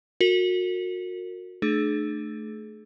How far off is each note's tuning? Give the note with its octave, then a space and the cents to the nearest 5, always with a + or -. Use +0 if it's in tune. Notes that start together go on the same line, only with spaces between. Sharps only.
F#4 -30 A#4 -30
A3 -5 D4 +40 G#4 +30